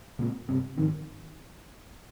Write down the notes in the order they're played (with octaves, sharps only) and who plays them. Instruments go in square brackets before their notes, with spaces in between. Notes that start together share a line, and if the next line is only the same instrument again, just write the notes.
[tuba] A#2 [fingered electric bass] C#3 G#3 C4
[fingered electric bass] G2 G3 C4 [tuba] C3
[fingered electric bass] G#2 F3 C4 [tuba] D#3